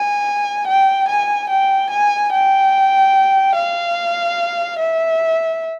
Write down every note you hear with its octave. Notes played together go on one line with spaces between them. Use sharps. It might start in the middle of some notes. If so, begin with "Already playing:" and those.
Already playing: G#5
G5
G#5
G5
G#5
G5
F5
E5